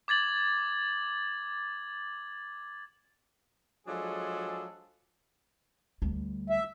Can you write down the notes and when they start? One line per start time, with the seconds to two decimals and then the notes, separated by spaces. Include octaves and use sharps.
0.08 D6 G#6 A6 F#7
3.87 F3 F#3 G#3 D4 G#4 A4
6.02 D2 G3
6.50 E5